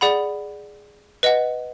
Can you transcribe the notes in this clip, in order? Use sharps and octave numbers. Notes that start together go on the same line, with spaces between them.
G#4 D5 F#5 B5
B4 D#5 F#5